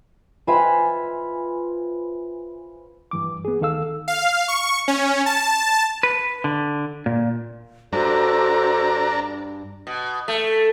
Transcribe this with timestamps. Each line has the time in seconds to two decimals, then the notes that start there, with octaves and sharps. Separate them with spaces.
0.47 F4 B4 C5 E5 G#5 B5
3.11 G2 E3 D6
3.45 B3 G#4
3.61 D2 D#3 A4 F5 E6
4.08 F5
4.48 C#6
4.88 C#4
5.26 A5
6.03 B4
6.44 D3
7.06 A#2
7.93 G2 D4 F#4 A4 C5 A#5
9.87 B2
10.28 A3